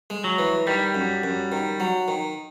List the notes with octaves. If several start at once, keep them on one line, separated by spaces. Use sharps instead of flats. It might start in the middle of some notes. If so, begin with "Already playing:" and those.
G#3
F#3
E3
D#3 G3
F#2
F#2
D#3
F#3
D#3